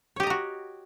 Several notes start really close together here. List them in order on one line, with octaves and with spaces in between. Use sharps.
C#5 G4 D#5 A#5 F#4